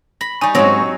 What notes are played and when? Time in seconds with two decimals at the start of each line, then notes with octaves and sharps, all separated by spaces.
0.21 B5 A#6
0.41 G3 D#4 G#5 C#6
0.55 G#2 F#3 C4 C#4 D#4 A#6